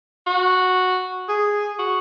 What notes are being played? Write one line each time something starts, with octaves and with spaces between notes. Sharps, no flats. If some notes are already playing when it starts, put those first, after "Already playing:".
F#4
G#4
F#4